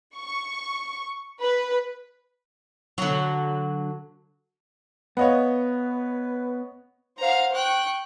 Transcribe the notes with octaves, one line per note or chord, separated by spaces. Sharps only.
C#6
B4
D3 F#3
B3 B4 C#5 D#5 F5 F#5 B5
C5 F5 F#5 A#5
G5 C#6 F#6